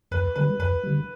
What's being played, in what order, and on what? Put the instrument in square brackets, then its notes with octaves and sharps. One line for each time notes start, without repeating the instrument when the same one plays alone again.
[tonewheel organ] F2 [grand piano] B4
[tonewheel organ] D3 G3 [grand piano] B4
[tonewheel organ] F2 [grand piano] B4
[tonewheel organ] D3 G3